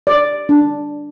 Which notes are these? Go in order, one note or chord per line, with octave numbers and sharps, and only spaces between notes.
D5
D4